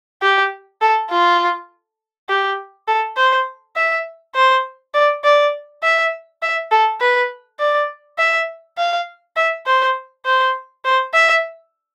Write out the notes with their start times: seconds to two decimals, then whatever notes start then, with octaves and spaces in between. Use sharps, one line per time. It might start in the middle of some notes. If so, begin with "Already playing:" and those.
0.22 G4
0.81 A4
1.10 F4
2.29 G4
2.88 A4
3.17 C5
3.76 E5
4.35 C5
4.94 D5
5.24 D5
5.83 E5
6.42 E5
6.71 A4
7.01 B4
7.59 D5
8.18 E5
8.78 F5
9.36 E5
9.66 C5
10.25 C5
10.84 C5
11.13 E5